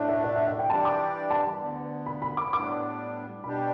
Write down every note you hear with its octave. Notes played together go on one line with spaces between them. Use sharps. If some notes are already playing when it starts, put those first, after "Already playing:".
Already playing: A2 A3 D4
E5
E5
E5
E5
G5
E3 G3 D4 G4 D5 A5
D6
A5
D2 D3 B3
B5
B5
D6
A2 G3 B3 D4 D6
B2 G3 D4 G4 B5